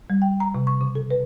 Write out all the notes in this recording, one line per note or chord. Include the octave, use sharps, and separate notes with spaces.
G3
G5
A#5
C3
C#6
C#3
A4
B4